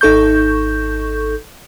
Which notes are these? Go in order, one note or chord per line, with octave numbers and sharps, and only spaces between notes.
G#1 D#4 A4 C#6 G6